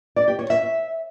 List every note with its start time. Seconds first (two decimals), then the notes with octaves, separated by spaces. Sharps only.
0.16 D5
0.28 G4
0.39 C#5
0.50 E5